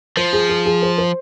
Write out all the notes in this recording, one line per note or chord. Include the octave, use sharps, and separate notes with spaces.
F3 C5
G#4
G#4
G#4
C5
C5